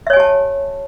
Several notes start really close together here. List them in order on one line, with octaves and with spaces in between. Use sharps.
E5 C#5 G#5 G4 A5